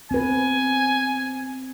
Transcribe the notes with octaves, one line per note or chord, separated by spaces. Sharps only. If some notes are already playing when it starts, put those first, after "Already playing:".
C4 B4 G#5